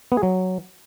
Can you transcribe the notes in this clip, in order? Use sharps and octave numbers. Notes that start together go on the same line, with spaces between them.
B3
G#4
F#3